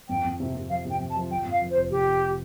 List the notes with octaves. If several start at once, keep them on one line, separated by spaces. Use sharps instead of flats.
F2 G5
F2
C3
C3
F3 F5
C3
G5
F2
A5
F3
F3 G5
F2
F5
F3
C5
F1
F1 G4
F1